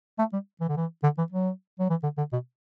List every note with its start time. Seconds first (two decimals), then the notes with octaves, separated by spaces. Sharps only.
0.19 A3
0.33 G3
0.61 E3
0.69 D3
0.77 E3
1.03 D3
1.18 E3
1.32 F#3
1.79 F#3
1.90 E3
2.03 D3
2.18 D3
2.33 B2